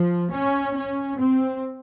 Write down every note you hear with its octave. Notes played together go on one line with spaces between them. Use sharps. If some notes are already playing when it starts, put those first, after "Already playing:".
Already playing: F3
C#4
C#4
C4